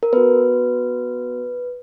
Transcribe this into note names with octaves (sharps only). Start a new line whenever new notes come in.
A#4
B3 F#4 B4